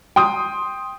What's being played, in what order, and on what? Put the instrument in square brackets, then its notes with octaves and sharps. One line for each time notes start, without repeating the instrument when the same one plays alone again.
[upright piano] G5 C6 D#6